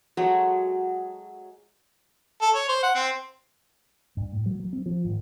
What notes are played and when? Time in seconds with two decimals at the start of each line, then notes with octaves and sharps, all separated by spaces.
0.17 F#3 G#3 A3
2.42 A4
2.55 C#5
2.69 C5
2.83 F#5
2.95 C4
4.17 G2
4.32 A2
4.46 F#3
4.60 F#3
4.73 C4
4.86 F3
5.05 G#1